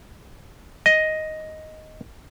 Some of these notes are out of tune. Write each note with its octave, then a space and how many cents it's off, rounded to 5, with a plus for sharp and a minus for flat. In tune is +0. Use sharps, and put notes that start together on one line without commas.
D#5 +5